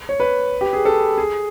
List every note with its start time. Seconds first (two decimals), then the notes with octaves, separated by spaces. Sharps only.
0.09 C#5
0.20 B4
0.61 G4
0.73 G#4
0.85 A4
1.18 G#4